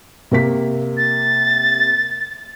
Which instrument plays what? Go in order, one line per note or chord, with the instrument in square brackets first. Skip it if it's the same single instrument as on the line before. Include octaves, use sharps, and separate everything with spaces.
[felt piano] C3 A#3 B6
[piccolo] A6